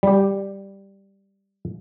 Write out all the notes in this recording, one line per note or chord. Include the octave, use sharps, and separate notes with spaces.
G3 G4